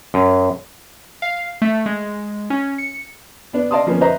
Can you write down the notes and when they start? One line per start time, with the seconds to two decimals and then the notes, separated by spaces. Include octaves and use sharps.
0.14 F#2
1.22 F5
1.62 A3
1.86 G#3
2.50 C#4
2.78 C#7
3.53 B3 D4
3.71 D5 D#5 F5 A5 C6 D#6
3.87 F3 A#3 B3 C#4
4.01 B4 C5 D#5 E5 A#5